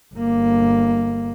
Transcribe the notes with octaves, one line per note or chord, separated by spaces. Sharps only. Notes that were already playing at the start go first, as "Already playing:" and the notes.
G1 A#3